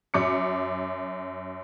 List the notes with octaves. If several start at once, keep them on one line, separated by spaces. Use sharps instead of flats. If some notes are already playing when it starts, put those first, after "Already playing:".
F#2 D6 C#7